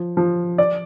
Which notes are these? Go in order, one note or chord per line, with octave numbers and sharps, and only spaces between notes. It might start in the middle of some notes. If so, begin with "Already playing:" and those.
Already playing: F3
F3
D5